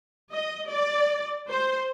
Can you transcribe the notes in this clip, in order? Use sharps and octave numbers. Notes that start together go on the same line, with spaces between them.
D#5
D5
C5